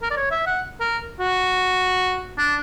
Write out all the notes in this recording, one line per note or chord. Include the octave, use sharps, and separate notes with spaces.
A#4
D5
C#5
E5
F#5
A#4
F#4
D4